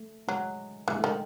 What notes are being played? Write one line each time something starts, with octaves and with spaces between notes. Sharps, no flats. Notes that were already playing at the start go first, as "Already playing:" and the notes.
Already playing: A3
F#3 G#3
E3 G#3
A3
D#3 G#3